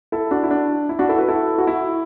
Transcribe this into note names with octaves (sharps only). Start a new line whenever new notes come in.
E4 A4
D4 F#4
E4
D4
E4
D4 F#4
E4 A4
F#4 B4
E4 A4
F#4
E4